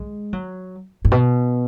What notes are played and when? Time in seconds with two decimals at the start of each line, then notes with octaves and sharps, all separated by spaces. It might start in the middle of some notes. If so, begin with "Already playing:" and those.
Already playing: G#3
0.33 F#3
1.05 G#2
1.12 B2